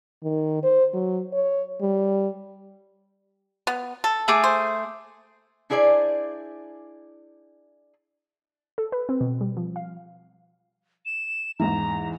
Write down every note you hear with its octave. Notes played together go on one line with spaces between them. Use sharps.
D#3
C5
F#3
C#5
G3
B3
A4
A3 G#4 D6
C5
D4 E4 G#4 C5 D5
A4
B4
C4
B2
G3
F3
F5
E7
E2 G#2 E3 A#5